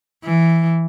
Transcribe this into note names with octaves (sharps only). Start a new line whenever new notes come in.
E3